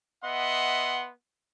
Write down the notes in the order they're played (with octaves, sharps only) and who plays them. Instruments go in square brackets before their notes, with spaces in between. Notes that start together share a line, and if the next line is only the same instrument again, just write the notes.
[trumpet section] B3 D#5 E5 F#5 C6